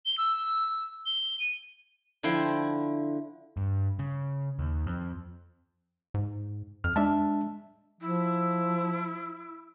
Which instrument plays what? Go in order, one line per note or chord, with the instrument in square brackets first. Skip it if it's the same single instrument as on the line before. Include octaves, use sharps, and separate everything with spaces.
[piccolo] G7
E6
G7
D#7
[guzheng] D3 F3 E4 G5 C6
[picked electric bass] G2
C#3
D#2
F2
[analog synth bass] G#2
[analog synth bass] F2 [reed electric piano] F6
[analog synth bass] G#3 [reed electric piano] D4 E5 A5
[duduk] F3 [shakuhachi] E4